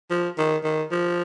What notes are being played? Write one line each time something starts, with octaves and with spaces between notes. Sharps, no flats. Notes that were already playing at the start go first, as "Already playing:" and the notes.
F3
D#3
D#3
F3